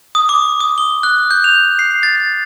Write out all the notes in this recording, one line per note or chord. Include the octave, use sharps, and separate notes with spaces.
D#6
D6
D#6
G7
F#6
G6
F7
C7
A6